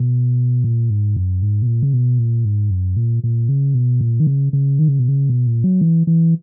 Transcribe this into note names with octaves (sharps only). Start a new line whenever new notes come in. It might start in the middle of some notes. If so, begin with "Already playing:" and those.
Already playing: B2
A#2
G#2
F#2
G#2
B2
A#2
C#3
B2
A#2
G#2
F#2
A#2
A#2
C#3
B2
A#2
D#3
C#3
C#3
D#3
C#3
B2
C#3
B2
A#2
F#3
E3
E3